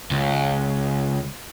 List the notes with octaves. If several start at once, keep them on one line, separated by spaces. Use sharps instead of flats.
C#2